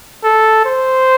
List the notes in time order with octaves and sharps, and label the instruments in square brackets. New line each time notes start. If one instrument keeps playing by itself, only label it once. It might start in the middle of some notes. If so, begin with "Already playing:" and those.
[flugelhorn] A4
C5